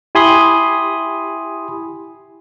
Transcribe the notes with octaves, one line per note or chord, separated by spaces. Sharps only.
E4 G4 G#5 B5 C6 D#6